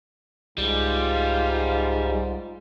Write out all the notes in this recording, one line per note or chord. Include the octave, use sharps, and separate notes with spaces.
C2 G#2 G3 F4